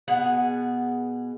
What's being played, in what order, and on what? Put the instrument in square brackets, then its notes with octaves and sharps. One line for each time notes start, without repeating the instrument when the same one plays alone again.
[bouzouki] B2 B3 G#4 F#5